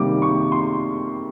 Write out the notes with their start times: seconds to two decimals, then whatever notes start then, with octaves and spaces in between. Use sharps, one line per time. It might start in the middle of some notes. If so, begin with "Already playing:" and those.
Already playing: C3 D#3 G3 A#3 D6
0.22 C#6
0.52 C6